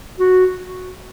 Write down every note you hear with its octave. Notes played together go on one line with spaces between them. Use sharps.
F#4